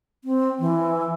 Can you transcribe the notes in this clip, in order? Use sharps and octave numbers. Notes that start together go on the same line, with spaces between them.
C4
E3